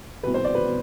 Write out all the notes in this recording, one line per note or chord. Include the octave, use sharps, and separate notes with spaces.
C2 B2 B4
C5
D5
B4
B2